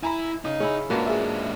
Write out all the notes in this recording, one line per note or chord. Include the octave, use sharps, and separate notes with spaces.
E4 G#5 A#5 B5
C#3 D#4
C#4 E4 G#4
G#2 A#3 D4 F4 F#4 B4 A5
G#4 E5